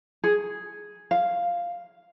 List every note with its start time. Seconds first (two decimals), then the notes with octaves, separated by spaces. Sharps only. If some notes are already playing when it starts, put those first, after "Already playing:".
0.24 G#4
1.11 F5